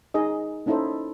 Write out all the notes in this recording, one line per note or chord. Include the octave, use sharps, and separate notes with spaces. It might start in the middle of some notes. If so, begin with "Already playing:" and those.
D#4 G#4 D#5
A#3 C#4 D#4 E4 A4 C5